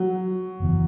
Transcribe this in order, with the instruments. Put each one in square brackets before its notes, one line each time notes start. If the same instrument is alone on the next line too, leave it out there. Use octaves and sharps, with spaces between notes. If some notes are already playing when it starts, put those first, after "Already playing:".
Already playing: [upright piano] F#3
[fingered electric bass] F#1 E2 E3